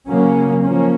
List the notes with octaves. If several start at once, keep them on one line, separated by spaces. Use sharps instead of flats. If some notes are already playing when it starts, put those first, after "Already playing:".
C#3 F#3 A#3 C#4
F3 A#3 C#4